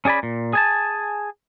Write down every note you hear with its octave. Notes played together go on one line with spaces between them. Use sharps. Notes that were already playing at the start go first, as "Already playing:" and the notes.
C#4 G#4 D5 G#5 B5
A#2
G#4 G#5 A5